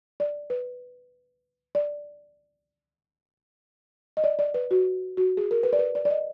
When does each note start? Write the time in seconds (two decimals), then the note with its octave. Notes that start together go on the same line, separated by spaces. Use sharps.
0.20 D5
0.50 B4
1.75 D5
4.17 D#5
4.24 D5
4.39 D5
4.54 B4
4.71 F#4
5.17 F#4
5.37 G#4
5.51 A#4
5.63 B4
5.73 D5
5.79 B4
5.95 D5
6.05 D5
6.10 D#5